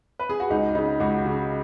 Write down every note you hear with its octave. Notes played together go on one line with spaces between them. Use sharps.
B4
G#4
F#4
C#2 D#4
C#3 D#4
C#2 F#4
C#3